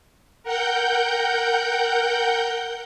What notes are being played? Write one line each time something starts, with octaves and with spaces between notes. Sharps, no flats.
A#4 F#5 G5 G6